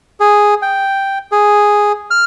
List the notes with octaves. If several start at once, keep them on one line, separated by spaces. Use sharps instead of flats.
G#4
G5
G#4
F6